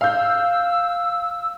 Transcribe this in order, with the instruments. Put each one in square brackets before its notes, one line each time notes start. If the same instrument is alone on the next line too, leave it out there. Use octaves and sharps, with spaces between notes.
[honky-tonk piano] F5 G6 [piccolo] E6